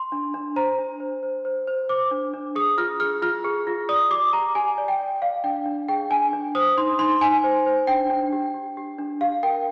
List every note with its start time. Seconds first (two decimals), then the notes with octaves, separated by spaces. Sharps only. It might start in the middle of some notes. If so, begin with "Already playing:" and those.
Already playing: C6
0.12 D4
0.34 D4
0.56 C5 A#5
0.78 D4
1.00 C5
1.23 C5
1.45 C5
1.67 C5
1.89 C5 D6
2.11 D4
2.34 D4
2.56 G#4 D#6
2.78 F4 F6
3.00 G#4 F6
3.22 F4 F6
3.44 G#4
3.67 F4
3.89 D5 D#6
4.11 G4 D6
4.33 G4 A#5
4.55 G4 G#5
4.78 D5
4.88 G5
5.00 D5
5.22 D5 F5
5.44 D4 G5
5.66 D4
5.89 G#4 G5
6.10 D4 G#5
6.33 D4
6.55 C5 D#6
6.77 D#4 C6
6.99 D#4 C6
7.21 D#4 G#5
7.44 C5
7.66 C5
7.87 D4 G5
8.10 D4
8.32 G4
8.54 G4
8.77 G4
8.99 D4
9.21 G4 F5
9.43 A#4 G5